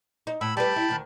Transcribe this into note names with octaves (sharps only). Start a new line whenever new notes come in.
D#4
A2 B5 E6
G3 A3 B4 G5 A5 B5
E4
D2 D#3